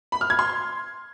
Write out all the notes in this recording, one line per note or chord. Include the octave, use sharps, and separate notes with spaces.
B5
F6
G#6
C6